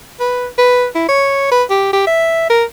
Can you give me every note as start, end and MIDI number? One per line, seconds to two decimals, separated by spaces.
0.20 0.47 71
0.58 0.86 71
0.95 1.06 64
1.09 1.50 73
1.52 1.64 71
1.70 1.92 67
1.93 2.04 67
2.07 2.49 76
2.50 2.65 70